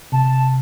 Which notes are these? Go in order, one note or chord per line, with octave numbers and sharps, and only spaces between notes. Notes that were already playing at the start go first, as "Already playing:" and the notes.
C3 A5